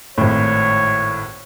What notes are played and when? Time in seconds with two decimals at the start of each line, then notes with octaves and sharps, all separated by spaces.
0.18 G#1 A2 C#5